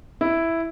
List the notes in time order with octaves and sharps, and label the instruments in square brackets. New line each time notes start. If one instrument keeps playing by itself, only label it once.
[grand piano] E4